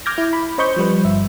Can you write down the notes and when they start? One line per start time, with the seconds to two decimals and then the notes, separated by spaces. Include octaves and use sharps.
0.06 D6 F6 G6 G#6 A#6
0.18 E4
0.33 B5
0.58 C#4 C5 D#5 B5 C#6 G6
0.76 F3 G3 B4
1.04 G1 E5